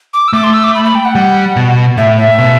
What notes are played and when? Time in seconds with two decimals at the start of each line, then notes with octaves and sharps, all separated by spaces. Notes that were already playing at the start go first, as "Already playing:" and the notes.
0.14 D6
0.28 E6
0.33 A3 D6
0.44 C6
0.53 E6
0.64 D6
0.75 B5
0.85 B5
0.95 G5
1.05 F#5
1.15 G3
1.56 B2
1.97 A2 E5
2.17 E5
2.38 B2